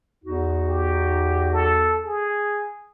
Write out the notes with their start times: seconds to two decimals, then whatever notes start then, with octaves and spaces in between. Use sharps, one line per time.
0.24 E2 D#4 F#4
0.69 G4
1.53 A4
2.06 G#4